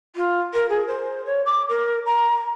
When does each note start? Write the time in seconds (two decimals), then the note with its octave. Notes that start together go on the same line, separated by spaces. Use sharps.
0.16 F4
0.53 A#4
0.69 G#4
0.87 C5
1.25 C#5
1.45 D6
1.69 A#4
2.06 A#5